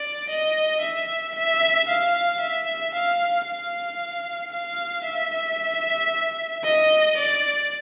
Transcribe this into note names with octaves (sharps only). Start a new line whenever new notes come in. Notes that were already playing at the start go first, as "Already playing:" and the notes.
Already playing: D5
D#5
E5
E5
F5
E5
F5
F5
F5
E5
D#5
D5